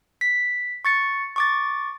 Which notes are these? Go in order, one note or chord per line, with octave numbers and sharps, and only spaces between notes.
B6
C#6 A6 C#7
C#6 D6 A6